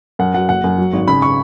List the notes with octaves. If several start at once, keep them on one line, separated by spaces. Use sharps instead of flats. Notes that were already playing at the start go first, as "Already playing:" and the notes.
F#2 F#5
F#3 F#5
F#1 F#5
F#2
F#3
G#1
C#3 B5
C#6